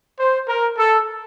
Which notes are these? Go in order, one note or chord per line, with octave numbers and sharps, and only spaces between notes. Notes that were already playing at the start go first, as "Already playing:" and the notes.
C5
A#4
A4